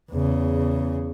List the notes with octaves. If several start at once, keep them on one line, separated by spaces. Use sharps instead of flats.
E2 C#3